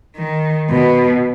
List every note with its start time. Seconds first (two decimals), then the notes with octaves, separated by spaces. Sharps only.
0.16 D#3
0.70 B2